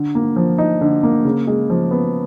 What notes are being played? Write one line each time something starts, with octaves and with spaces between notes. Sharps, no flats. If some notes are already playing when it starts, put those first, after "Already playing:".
Already playing: D3
A#3
F3
D#4
D3
A#3
C#3
G#3
F3
B3